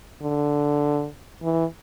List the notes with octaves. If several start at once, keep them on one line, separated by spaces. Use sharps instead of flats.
D3
E3